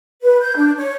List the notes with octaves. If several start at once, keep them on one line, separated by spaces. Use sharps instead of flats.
B4
G6
D4
C#5